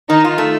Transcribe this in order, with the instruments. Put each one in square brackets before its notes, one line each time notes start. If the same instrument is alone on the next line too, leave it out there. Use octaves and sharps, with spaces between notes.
[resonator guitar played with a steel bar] D#3 [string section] D#4
[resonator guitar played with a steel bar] F4
A3